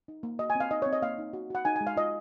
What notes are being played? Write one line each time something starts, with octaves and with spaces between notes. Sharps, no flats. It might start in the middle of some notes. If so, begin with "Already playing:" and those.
D#4
A#3
F#4 D#5
G#5
C4
F5
D#4 D#5
C#5
C4
D#5
A#3 F5
D#4
F#4
F#4 F#5
D#4 G#5
G#5
G#3
F5
F4 D#5